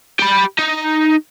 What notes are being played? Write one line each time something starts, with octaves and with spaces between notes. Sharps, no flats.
G4 B5
D#4